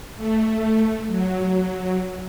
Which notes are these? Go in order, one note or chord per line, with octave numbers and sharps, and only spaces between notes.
A3
F#3